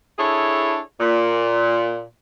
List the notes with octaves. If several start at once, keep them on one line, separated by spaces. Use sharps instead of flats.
D4 E4 G#4 A4 C#5
A#2